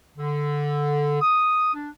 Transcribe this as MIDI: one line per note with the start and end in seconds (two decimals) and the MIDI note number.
0.17 1.19 50
1.22 1.72 87
1.74 1.90 62